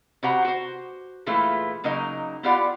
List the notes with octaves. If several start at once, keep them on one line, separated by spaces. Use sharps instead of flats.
C3 F#4 G4 C5 F#5 A#5
F#4 C5
A#2 E3 G#3 A3 E4 F4
C#3 F#3 A#3 D#4 A#4 D#5
B3 E4 F4 G4 D5 F#5